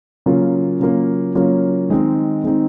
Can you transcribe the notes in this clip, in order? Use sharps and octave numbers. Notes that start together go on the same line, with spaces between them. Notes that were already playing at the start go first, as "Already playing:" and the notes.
C#3 F#3 A#3 C#4 F4
C#3 F#3 A#3 C#4 F4
C#3 F#3 A#3 C#4 F4
D#3 G#3 C4 D#4
D#3 G#3 C4 D#4